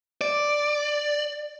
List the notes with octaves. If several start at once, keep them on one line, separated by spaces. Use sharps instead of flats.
D5